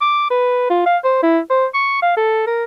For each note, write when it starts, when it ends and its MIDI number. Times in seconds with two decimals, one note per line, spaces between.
0.01 0.30 86
0.31 0.70 71
0.70 0.85 65
0.86 0.97 77
1.04 1.20 72
1.23 1.40 64
1.50 1.66 72
1.74 1.99 85
2.02 2.16 77
2.17 2.46 69
2.47 2.64 70